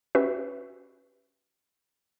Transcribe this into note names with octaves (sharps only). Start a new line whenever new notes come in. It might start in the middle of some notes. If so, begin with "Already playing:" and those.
C#4 F#4 G4 B4 E5